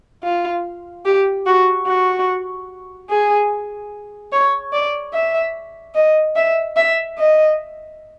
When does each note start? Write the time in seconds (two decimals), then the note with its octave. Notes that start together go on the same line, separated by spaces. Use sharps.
0.23 F4
1.05 G4
1.46 F#4
1.87 F#4
3.09 G#4
4.32 C#5
4.73 D5
5.13 E5
5.95 D#5
6.36 E5
6.76 E5
7.18 D#5